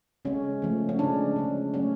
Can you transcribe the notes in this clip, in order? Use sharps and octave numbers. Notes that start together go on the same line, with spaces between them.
C#3 G#3 C#4
C#3 F3 A3
C#4
C#3 G#3 D4
C#3 G#3
C#3 F#3 A3 C#4